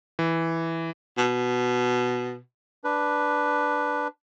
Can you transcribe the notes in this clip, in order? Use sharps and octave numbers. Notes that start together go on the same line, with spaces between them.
E3
B2
D4 B4